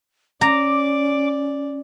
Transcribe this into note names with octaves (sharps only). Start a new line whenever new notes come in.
C#4 D5 A#5 D6